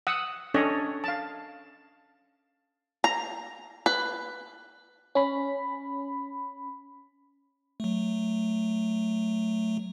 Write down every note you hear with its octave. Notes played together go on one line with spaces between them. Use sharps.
F#5 D#6 E6
C#4 D4 A4 C#5 D#5
F5 A5
A#5
B4
C#4 B5
F#3 A3